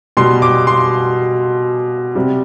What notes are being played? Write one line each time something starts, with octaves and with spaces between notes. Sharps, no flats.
B2 G3 C6
D6
C6
C3 G3